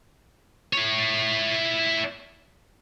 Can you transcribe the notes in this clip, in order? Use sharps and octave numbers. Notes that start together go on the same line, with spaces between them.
E4 C#5